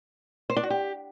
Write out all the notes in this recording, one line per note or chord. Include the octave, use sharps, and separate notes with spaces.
C5
D4
F#4
G4